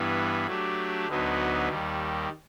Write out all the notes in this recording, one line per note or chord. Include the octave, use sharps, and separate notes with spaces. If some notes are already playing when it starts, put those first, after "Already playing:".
Already playing: G2 E3 G3 B3
F#3 A3 D4 G4
D2 D3 F#3 B3 D#4
D#2 D#3 G3